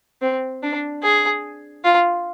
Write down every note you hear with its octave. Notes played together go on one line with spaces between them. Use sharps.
C4
D4
G#4
F4